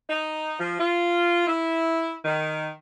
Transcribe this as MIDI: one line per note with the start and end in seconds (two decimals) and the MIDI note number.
0.09 0.55 63
0.59 0.76 53
0.79 1.45 65
1.47 2.16 64
2.25 2.71 51